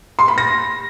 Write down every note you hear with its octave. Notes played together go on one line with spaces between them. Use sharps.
C6
B5
A#6